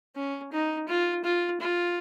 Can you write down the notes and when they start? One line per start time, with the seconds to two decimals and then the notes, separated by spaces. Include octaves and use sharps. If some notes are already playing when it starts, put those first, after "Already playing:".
0.15 C#4
0.52 D#4
0.88 F4
1.24 F4
1.60 F4